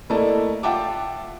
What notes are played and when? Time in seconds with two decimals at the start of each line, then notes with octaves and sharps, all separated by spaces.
0.10 A3 A#3 E4 D5 D#5 A5
0.63 F4 E5 F#5 G5 A5 D6